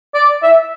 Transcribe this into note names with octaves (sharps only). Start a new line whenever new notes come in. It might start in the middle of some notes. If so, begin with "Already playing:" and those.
D5
E5